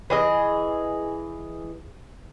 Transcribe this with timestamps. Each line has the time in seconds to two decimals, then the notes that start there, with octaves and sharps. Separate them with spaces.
0.10 E3 G#4 D#5